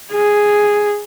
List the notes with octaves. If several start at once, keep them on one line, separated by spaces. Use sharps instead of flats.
G#4